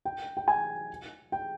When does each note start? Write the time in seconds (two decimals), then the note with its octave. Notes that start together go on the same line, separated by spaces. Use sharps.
0.05 G5
0.37 G5
0.48 G#5
1.32 G5